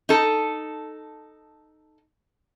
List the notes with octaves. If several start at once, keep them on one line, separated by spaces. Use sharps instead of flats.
D#4 A4